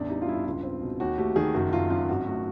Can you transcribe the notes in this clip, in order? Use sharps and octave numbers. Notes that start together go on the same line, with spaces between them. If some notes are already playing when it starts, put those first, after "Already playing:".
Already playing: A1 E2 D4
G3 D#4
F4
G2 E4
C#2 F4
C4
B2
D#2 F#4
A3 G4
D#3 G#4
F#1 F#4
F#1 F4
F#2 F4
G#1 F#4
A3 F#4